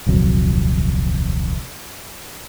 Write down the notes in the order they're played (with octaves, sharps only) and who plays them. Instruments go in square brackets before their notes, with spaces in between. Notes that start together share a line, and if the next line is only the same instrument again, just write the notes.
[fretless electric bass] D#1 C2 F2 F#3